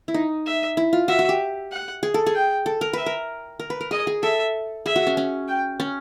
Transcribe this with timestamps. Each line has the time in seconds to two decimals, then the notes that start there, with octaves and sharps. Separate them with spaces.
0.08 E4
0.14 D#4
0.46 E5
0.77 E4
0.93 F4
1.08 F#4 E5
1.19 F#4
1.29 G4
1.71 F#5
2.03 G#4
2.14 A4
2.26 G#4
2.34 G5
2.66 A4
2.81 A#4
2.93 B4 E5
3.06 A#4
3.59 A#4
3.70 B4
3.81 A#4
3.91 G#4 D#5
4.07 G#4
4.23 A4 E5
4.86 G#4 E5
4.96 F#4
5.07 C#4
5.17 C#4
5.48 G5
5.80 C#4